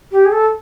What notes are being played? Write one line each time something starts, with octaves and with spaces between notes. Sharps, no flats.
G4
G#4
A4